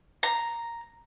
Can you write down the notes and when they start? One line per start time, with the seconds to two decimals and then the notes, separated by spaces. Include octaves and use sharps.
0.23 A#5